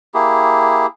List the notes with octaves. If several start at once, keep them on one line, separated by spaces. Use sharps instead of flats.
A#3 E4 G4 G#4